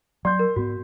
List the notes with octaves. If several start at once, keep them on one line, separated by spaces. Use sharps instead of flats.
F#3 D5 C6 G6
A#4
G#2 B3 F#4